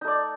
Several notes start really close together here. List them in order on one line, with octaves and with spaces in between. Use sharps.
D#4 A3 D5